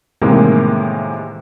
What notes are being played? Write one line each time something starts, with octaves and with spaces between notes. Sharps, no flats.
A2 C3 D#3 E3 G#3 A#3